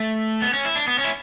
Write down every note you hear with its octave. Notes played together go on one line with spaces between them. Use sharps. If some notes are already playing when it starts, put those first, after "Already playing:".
Already playing: A3
B3
C#4
E4
D4
B3
C#4
E4